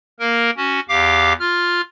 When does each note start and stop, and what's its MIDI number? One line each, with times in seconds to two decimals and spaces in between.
0.20 0.51 58
0.20 0.51 70
0.57 0.80 61
0.57 0.80 66
0.89 1.33 40
0.89 1.33 67
0.89 1.33 77
0.89 1.33 86
1.40 1.81 65
1.40 1.81 89